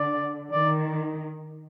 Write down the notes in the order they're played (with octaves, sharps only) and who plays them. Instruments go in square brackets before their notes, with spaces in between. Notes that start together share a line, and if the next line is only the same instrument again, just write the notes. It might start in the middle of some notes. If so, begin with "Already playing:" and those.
Already playing: [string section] D3 [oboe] D5
[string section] D#3 [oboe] D5